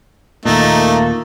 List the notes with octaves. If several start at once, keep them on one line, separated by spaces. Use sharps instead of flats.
D#2 A#2 A3 A#3 D#4